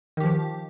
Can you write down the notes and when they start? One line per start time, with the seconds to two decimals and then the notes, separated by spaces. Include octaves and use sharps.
0.17 D#3
0.20 G4
0.23 F3